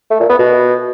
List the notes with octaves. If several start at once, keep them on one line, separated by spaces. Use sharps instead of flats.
A3
A#2
B3
B2